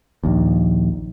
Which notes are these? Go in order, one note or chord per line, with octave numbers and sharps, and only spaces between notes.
A#1 D#2